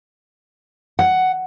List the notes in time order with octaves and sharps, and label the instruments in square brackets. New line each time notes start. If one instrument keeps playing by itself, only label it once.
[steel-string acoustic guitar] F#5